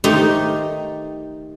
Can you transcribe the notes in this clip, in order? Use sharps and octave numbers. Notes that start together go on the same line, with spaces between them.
D#3 A3 D#4 G4 C5